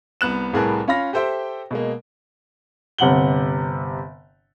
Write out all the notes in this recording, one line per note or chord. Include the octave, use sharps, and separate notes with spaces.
C2 B3 F#6 E7
C2 A2 G#4 A#4 B4 A5
C#4 F4 F5 B5 A#6
G4 A4 C5 E5 G5
B2 G#3 A#3
G1 C3 F#5 F#7 G7